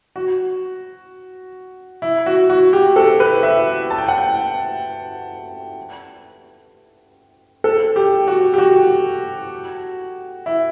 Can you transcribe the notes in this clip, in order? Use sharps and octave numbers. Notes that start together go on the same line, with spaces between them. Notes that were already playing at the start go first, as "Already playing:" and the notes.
F#4
E4
F#4
F#4
G4
A4
B4
E5
A5
G5
F#5
G5
A4
G4
F#4
G4
F#4
E4